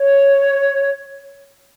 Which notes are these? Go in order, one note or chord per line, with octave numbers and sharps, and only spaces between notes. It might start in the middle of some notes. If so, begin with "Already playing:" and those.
Already playing: C#5